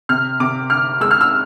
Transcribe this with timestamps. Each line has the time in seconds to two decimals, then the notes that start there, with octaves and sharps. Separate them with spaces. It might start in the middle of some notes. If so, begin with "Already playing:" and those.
0.09 C3 F6
0.40 C3 D6
0.70 D2 F6
1.00 G#3 E6
1.11 F6
1.21 E6